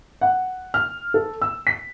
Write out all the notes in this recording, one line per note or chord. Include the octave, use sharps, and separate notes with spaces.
F#5
F6
A4
E6
B6